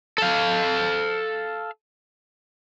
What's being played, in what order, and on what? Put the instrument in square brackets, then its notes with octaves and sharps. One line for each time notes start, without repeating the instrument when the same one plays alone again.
[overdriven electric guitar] A4 F5